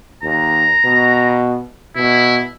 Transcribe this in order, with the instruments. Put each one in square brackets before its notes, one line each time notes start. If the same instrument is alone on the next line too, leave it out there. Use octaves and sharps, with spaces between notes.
[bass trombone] D#2 [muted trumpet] A#5
[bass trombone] B2
[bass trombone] B2 [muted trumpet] E4